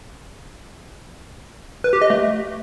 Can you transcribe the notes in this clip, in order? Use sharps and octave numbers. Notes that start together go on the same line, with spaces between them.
B4
G4
D#5
A3